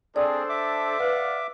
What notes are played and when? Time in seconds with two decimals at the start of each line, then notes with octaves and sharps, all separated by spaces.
0.16 C4 D4 G#4 A4 C5 D5
0.49 E5 D6
0.99 B4 D5 F5 F#5